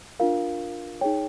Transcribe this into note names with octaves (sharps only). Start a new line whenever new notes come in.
D4 F4 A#4 F5
D#4 G#4 C#5 G5